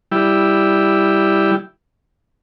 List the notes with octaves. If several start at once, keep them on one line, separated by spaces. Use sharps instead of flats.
G3 E4